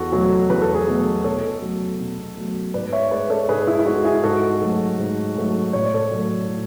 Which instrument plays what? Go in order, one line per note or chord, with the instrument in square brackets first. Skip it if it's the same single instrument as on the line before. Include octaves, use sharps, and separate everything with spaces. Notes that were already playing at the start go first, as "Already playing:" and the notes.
Already playing: [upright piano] E2 F#4 A4
B2 F#3 A3
E2 B4
A4
G#4 B4
B2 F#3 A3
B2 A4 C#5
F#3 A3
B2
F#3 A3
G#2 B4 D5
C#5 E5
G#3 B4 D5
A4 C#5
G#2 G#4 B4
E4
E4
G#3 F#4
E4 G#4
G#2 F#4 A4
F#3 A3
G#2
F#3 A3
A2 C#5
D5
A4 C#5
F#3 A3
A2